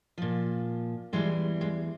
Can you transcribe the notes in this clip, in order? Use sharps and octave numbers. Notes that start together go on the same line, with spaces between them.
A#2 F3
E2 E3 G3 G#3
G#3